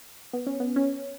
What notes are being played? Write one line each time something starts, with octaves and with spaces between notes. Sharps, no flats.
B3
C#4
B3
C#4